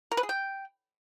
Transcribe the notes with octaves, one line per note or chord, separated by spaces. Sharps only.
A#4
B4
G#4
G5